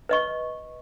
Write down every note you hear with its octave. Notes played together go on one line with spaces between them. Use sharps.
B4 D#5 C#6